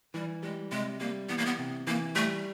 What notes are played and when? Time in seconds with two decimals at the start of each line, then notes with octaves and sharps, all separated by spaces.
0.14 E3 G3
0.43 G3 G#3
0.72 C3 G#3
1.00 G3 A#3
1.29 E3 B3
1.38 A#3
1.46 B3
1.59 C3
1.87 E3 A#3
2.16 G3 A3